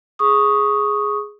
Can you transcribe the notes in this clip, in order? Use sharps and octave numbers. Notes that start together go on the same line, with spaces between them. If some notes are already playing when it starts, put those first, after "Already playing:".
G#4 C#6 D#6